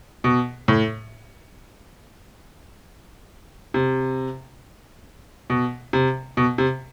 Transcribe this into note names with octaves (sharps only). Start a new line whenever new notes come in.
B2
A2
C3
B2
C3
B2
C3